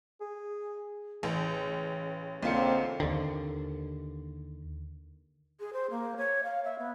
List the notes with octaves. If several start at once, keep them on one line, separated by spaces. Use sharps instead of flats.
G#4
A1 C#3
B1 D3 A#3 C4 F4 C#7
D#2 D3
G#4
C5
A#3
C#5
F5
E5
B3